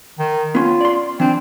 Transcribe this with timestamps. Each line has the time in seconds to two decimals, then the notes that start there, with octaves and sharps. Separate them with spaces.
0.19 D#3
0.55 B3 C#4 F4
0.81 D5 C6
1.20 E3 C4 D4